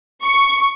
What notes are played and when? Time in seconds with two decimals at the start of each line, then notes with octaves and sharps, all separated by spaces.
0.24 C#6